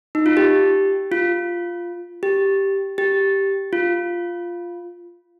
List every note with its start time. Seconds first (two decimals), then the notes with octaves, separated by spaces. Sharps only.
0.15 D#4
0.26 F4
0.37 G4
1.12 F4
2.23 G4
2.98 G4
3.73 F4